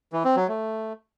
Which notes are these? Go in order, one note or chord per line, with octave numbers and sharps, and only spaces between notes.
E3
C4
F#3
A3